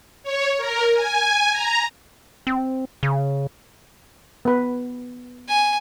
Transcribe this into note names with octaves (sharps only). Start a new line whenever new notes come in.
C#5
A#4
G#5
A#5
C4
C#3
B3 B4
G#5